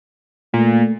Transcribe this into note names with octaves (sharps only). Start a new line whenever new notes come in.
A#2 A3